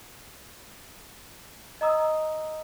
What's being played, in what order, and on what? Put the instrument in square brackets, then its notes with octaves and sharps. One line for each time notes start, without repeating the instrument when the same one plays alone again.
[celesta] D#5 A#5 D#6 E6